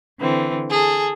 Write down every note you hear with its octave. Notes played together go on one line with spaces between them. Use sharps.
D3 E3 C4
G#4 A4